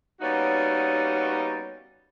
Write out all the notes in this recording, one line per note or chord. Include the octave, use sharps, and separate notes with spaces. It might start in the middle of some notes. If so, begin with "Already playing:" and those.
G3 A#3 B3 C#4 D#4 F#4